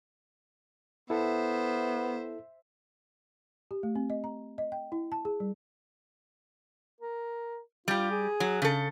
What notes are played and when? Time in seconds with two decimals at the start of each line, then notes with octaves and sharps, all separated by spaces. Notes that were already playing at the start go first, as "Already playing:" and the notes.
1.10 B3 E4 A4 C5 E5
3.71 G4
3.83 A3
3.95 C4
4.10 D#5
4.24 A#5
4.58 D#5
4.72 G5
4.92 E4
5.12 A5
5.25 G#4
5.40 G3
7.01 A#4
7.88 G3 F4 G4
8.11 G#4
8.40 F#3
8.62 C#3 A4